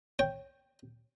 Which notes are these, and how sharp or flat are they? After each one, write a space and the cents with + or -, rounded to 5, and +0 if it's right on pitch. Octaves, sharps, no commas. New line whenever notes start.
C#5 -20 G5 +0